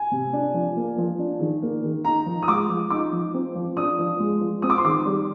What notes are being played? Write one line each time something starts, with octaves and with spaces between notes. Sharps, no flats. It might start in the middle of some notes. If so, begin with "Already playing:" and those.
Already playing: G#5
C3
D4
F3
A#3
F3
D4
D#3
A#3
D#3
D#4 A#5
F3
D#6
G#3 D6
F3
D#4 D6
F3
C4
F3
D4 D#6
F3
G#3
F3
C4 D#6
D6
C6
D#3 D6
G3